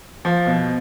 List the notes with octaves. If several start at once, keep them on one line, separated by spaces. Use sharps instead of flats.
F3
B2